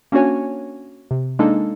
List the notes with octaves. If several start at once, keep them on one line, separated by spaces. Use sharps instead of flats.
A#3 C#4 D4 F#4 C#5 G#5
C3
G#3 A#3 D4 D#4 A4